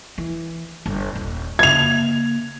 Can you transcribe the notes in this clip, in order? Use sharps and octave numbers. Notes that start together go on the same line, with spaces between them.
E3
G1
D#1
C#3 A#3 G#6 F7